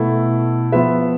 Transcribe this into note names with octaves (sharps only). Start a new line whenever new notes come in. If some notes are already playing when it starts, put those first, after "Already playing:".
Already playing: B2 A3 E4 A4
F3 B3 F4 B4 E5